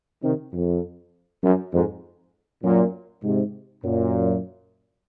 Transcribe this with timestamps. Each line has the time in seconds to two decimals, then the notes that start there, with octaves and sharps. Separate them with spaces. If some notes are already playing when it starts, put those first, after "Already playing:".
0.23 C3 D#3
0.53 F2
1.43 F#2
1.73 F2 G#2
2.64 F#2 A#2
3.23 G#2 C3
3.84 F#2 A#2